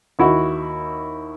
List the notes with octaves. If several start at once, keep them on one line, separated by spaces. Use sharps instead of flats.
D#2 E4 F#4